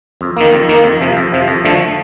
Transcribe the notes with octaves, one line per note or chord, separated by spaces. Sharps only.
F2
D#3 A#3
F2
D#3 A#3
F2
C3 F3
F2
C3 F3
F2
D3 F3 A3